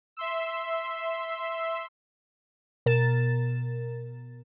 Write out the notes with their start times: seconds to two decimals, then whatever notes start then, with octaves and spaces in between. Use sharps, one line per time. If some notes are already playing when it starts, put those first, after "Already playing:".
0.17 E5 C6 E6
2.86 B2 A#4 A6 E7